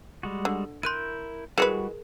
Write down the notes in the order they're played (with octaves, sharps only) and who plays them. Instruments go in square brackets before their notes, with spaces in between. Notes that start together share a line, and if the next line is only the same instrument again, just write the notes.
[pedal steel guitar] G3 G#3 F#4
[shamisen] D3
[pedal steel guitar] E4 A#4 G6 [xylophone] C6 F#6 D#7
[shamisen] E3 G#3 B4 [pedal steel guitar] G3 F#4 [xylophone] G#4 A#4 C#7